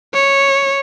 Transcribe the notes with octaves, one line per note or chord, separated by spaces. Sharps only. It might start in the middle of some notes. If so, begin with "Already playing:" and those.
C#5